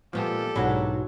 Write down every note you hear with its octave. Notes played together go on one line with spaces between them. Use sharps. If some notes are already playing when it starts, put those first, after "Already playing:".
A#2 F3 G#3 B3 G4 A4
B1 G#2 F#3 D4 E4 F#4 C#5 G#5